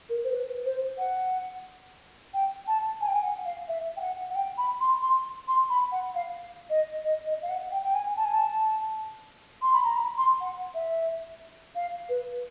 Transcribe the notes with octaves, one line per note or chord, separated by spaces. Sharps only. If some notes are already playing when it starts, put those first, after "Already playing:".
A#4
C5
B4
C5
F#5
G5
A5
G#5
G5
G#5
F#5
F5
E5
G5
F#5
F#5
G5
B5
C6
C6
C6
B5
F#5
F5
D#5
D#5
D#5
F5
F#5
G5
G5
G#5
A5
G#5
A5
C6
B5
A#5
B5
C6
F#5
E5
F5
B4